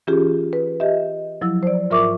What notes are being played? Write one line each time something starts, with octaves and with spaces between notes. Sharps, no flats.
E3 C#4 F4 G4 G#4
B4
G4 D#5 E5
F3 F#3 E4 E6
C5 D5
G#2 F4 A#4 E5 C#6 D6